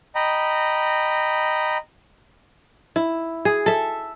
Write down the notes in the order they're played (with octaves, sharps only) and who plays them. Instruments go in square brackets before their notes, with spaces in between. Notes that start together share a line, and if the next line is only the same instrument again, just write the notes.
[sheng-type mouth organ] D#5 G5 A#5 B5
[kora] E4
G#4
A4 E5